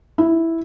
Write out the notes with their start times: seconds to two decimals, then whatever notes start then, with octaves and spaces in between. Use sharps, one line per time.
0.18 E4